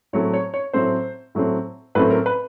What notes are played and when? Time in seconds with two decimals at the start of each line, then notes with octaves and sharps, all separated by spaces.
0.13 A2 F#3 A3 C4 C#5
0.34 C#5
0.54 C#5
0.73 A2 F#3 A3 C4 C5
1.35 A2 F#3 A3 C4
1.95 A2 F#3 A3 C4 B4
2.10 A#4
2.26 B4